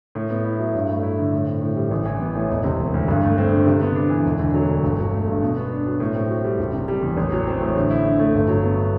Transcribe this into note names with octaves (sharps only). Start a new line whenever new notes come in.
A2
B3
E4
F#3
G2
A3
E4
D3
A2
C4
A2
G3
A1
E3
B3
A2
E1
C3
E1
D2
G2
A3
C4
D3
C3
B3
D4
E3
E1
D3
F#3
D2
G1
F#3
A3
G2
B2
B3
D4
F#3
A2
C4
F#4
G3
F#1
C3
G3
E2
A1
F#3
C4
A2
D3
E4
D3
A3
G1
F#3
B3